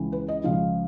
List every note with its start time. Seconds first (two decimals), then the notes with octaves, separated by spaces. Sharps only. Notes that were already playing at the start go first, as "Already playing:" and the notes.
Already playing: C#2 C#3 E3
0.12 B4
0.28 D#5
0.44 C#2 C#3 F3 F5